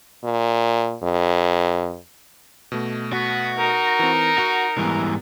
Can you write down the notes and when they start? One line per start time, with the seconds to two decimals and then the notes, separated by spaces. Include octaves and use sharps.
0.24 A#2
1.03 F2
2.72 B2 A3
3.13 B3 F#4
3.58 D#4 A#4
3.99 E3 C4
4.38 F#4 F#5
4.78 G#2 E3 G3 B3